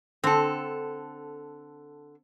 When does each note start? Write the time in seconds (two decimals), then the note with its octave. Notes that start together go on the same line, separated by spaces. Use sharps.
0.24 D3 C4 A4